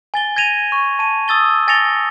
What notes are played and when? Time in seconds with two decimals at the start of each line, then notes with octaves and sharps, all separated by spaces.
0.14 G#5 A6 G7
0.36 G#6 A#6 D#7 F7
0.72 C#6
0.99 A5 D#7
1.28 D#6 E6 A6 G7
1.68 G#5 A6 A#6 C#7 F7 G7